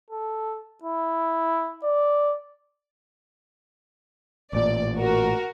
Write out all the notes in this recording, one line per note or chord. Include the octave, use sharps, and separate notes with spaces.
A4
E4
D5
A1 A#2 D5
F#4 A#4